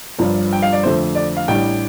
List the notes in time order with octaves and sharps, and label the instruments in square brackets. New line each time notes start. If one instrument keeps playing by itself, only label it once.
[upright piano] G1 G2 F3 D4
G5
F5
D5
F2 D3 A3 C4 C5
D5
F5
A1 A2 G3 D4 G5